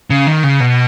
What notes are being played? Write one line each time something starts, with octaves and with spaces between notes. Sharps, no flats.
C#3
D#3
C#3
B2